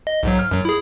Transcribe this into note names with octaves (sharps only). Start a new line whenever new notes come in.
D#5
B1 G#2 F#3
F6
F#2 F#3
E4 G#4